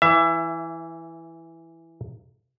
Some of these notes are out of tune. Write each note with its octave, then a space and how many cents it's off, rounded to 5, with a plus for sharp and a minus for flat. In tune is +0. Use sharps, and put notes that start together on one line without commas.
E3 +0 E5 +25